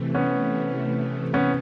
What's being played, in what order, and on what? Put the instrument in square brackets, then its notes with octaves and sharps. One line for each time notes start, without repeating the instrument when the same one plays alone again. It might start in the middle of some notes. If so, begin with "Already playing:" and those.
Already playing: [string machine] C3 E3 A3
[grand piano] B3 C#4
B3 C#4